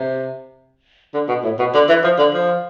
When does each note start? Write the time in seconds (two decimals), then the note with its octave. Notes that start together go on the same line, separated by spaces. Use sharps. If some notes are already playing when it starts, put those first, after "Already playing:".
Already playing: C3
1.14 D3
1.28 B2
1.44 A2
1.59 B2
1.74 D3
1.88 E3
2.04 F3
2.18 D3
2.33 F3